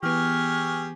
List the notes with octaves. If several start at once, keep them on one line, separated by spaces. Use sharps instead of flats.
E3 B3 G4 G#4 C#6 F6